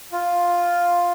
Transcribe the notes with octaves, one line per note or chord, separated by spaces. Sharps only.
F4